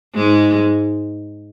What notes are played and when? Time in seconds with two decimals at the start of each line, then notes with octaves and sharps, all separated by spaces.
0.15 G#2 G#3